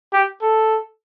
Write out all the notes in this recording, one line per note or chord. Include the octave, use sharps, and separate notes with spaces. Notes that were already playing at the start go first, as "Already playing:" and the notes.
G4
A4